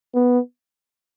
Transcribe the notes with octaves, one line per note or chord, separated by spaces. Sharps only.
B3